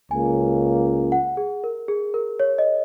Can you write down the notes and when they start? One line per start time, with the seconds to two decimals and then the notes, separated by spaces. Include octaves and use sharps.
0.10 C#2 C#3 A#3 G#5
1.12 F#5
1.37 G#4
1.64 A#4
1.88 G#4
2.14 A#4
2.40 C#5
2.58 D#5